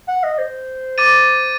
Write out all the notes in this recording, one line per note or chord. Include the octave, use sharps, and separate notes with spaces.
F#5
D#5
C5
D6 A6 D#7